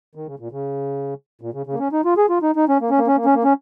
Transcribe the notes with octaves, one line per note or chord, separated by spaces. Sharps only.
D#3
C#3
A#2
C#3
A#2
C#3
C#3
A#3
C#4
D#4
F4
G#4
F4
D#4
D#4
C#4
A#3
C#4
A#3
C#4
A#3
C#4
A#3
C#4